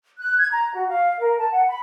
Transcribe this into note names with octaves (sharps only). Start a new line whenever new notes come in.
F#6
G#6
A#5
F#4
F5
A#4
A5
F#5
B5